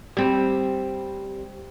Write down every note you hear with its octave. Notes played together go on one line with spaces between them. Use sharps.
G3 C4